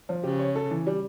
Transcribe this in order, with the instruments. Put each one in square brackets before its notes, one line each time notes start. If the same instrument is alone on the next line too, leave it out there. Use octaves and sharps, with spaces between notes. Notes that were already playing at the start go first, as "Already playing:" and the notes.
[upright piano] F3
[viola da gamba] C#3 [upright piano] G4
[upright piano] C#5
A4
E3
G3